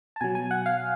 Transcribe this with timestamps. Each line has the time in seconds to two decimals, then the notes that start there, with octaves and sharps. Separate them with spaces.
0.16 A5
0.21 B2 F#3 G#5
0.35 G#5
0.51 F#5
0.66 F5